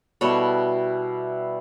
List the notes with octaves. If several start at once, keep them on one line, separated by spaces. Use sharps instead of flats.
B2 G3 E4 A4 C#5